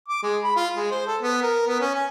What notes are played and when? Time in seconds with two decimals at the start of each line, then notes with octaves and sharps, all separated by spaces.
0.08 D6
0.23 G#3
0.44 B5
0.56 F4
0.76 G#3
0.91 C5
1.07 A4
1.21 B3
1.42 A#4
1.67 B3
1.80 C#4
1.95 G#5